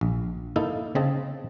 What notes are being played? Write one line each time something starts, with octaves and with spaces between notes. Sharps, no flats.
A#1
A#3 D#4 E4 A4
C#3 C4 D#5 A5